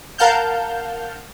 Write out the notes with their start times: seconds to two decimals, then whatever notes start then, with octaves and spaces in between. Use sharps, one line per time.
0.18 A#4 F5 F#5 A5 F6 G6